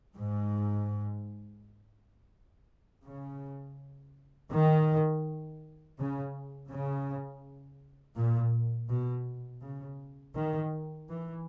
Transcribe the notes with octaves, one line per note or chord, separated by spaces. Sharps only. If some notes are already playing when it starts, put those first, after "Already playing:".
G#2
C#3
D#3
C#3
C#3
A#2
B2
C#3
D#3
E3